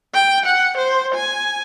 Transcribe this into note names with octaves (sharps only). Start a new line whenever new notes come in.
G5
F#5
C5
G#5